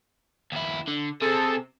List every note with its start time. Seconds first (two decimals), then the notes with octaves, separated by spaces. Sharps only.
0.52 D#2 E4
0.88 D3
1.22 C3 C4 G#4 A4